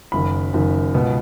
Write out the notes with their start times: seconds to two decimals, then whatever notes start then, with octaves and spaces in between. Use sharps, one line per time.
0.12 F#1 F#2 D#3 B5
0.53 F#1 F#2 D#3
0.94 C#2 B2 B3